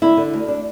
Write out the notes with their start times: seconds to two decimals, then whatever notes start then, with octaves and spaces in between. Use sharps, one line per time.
0.02 D3 E4
0.17 D3
0.34 D2
0.48 D4